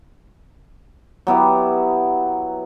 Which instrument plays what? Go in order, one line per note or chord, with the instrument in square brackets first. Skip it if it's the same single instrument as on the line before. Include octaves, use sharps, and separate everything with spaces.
[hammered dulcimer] F#3 B3 E4 G4